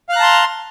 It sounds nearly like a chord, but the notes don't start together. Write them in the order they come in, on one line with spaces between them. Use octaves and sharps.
F5 F#6 A#5 A5 C6